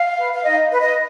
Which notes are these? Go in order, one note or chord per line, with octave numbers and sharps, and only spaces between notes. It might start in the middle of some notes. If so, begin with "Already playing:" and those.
Already playing: F5
B4
F5
D#4 D#5
B4
D#5